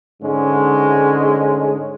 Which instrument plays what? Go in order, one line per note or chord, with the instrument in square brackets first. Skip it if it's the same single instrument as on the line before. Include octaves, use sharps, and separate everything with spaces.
[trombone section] G#2 D3 G#3 C#4